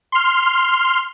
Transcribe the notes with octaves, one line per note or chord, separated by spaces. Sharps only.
C6 F6